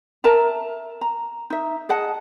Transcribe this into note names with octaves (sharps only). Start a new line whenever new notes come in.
A#4 E5 A5 A#5
A#5
D#4 E5
G#4 D#5 F#5 A5